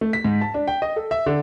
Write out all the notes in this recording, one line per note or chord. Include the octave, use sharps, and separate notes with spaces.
A3
B6
G#2
A5
D4
G5
D#5
A4
E5
D3